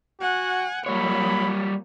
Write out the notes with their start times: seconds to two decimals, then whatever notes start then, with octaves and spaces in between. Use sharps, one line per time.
0.21 F#4 F#5 G#5
0.86 A#2 F#3 G3 C#5 B5